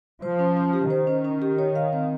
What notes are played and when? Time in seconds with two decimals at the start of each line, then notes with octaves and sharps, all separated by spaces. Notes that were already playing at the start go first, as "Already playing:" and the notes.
0.22 F3 C5
0.39 C#4
0.57 C#4
0.73 G4
0.90 D#3 C5
1.07 C#4
1.25 C#4
1.42 G4
1.59 C#5
1.76 F5
1.93 C4